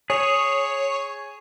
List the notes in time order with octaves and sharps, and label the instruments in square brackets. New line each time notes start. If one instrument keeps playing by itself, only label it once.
[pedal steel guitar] G#4 [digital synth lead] C#5